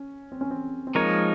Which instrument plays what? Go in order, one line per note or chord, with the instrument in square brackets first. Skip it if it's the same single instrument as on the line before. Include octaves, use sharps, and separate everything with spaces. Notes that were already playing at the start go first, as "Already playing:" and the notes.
Already playing: [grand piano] C#4
C4
C#4
C4
C4
[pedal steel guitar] F3 G#3 D#4 A#4 C#5 [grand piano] A#3